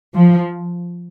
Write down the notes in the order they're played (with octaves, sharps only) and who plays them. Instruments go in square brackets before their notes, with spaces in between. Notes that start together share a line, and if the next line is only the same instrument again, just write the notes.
[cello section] F3